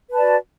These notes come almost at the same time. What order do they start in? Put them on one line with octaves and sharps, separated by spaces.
B4 A5 D5 F#4